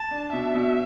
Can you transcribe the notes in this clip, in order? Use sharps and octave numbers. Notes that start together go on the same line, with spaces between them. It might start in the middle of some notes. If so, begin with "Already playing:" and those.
Already playing: A5
D4
B2 E5
B2